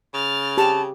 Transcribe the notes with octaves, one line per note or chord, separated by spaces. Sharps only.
C#3 F6 A6
G4 A5